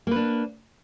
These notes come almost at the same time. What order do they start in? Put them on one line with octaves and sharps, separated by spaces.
A#3 B4 D4